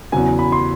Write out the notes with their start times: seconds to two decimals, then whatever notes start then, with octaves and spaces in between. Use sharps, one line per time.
0.12 E2 C#3 F#3 G#5
0.39 B5
0.52 C6